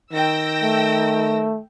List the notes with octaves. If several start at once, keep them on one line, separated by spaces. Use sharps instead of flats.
D#3 G5 E6 A#6
A3